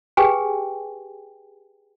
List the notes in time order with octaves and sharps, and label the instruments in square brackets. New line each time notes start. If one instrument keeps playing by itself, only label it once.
[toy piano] G4 G#4 B4 G5 G#5